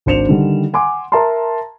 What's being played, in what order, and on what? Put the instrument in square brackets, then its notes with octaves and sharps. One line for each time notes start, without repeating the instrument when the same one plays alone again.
[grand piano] G#1 D4 C5 C#7 E7 F7
D3 D#3 G3
F#5 G#5 C6 D6
A#4 E5 A5 A#5 C6